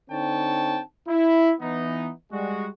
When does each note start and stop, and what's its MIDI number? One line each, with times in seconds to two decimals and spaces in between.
0.10 0.80 50
0.10 0.80 60
0.10 0.80 63
0.10 0.80 73
0.10 0.80 79
0.10 0.80 81
1.08 1.53 64
1.61 2.11 52
1.61 2.11 59
1.61 2.11 63
2.32 2.68 55
2.32 2.68 56
2.32 2.68 66